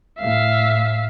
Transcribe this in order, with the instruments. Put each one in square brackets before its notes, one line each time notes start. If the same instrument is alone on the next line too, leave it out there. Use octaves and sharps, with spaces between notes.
[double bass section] A2 [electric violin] E5 F5